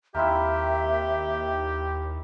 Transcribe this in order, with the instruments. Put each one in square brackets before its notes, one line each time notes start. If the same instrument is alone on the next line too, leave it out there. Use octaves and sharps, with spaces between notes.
[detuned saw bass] D#2 [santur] A#3 C4 E4 [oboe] G4 [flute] E5